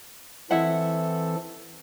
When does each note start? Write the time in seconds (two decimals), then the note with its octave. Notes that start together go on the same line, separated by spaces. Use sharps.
0.51 E3 C4 E4 A4 E5 F#5